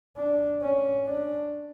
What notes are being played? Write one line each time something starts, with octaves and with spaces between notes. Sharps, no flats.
D4
C#4
D4